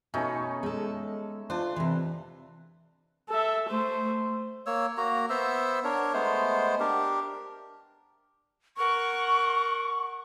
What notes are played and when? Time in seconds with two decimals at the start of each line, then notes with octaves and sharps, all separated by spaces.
0.14 B2 A3 C#4 D#4
0.63 G#3 A4
1.50 D4 F4 C5
1.76 C3 E3
3.29 A4 E5
3.69 A3 C5
4.66 A#3 C#5 E6
4.98 A#3 F#4 A#5
5.30 B3 C5 E5 E6
5.84 D4 A#4 C#5
6.13 G#3 A3 B3 C5
6.80 D4 G4 A#4
8.77 A#4 F#5 C#6